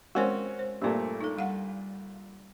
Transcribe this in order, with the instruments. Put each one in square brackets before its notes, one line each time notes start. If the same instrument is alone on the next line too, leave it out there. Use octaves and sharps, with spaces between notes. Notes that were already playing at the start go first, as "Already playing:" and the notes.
[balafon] G#3 A#4 C5 [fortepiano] C4 C#4 F#4
[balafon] C5
[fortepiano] G2 A#2 A3 [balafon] G4 A#4
[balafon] D#4 A4
G3 F5 F#5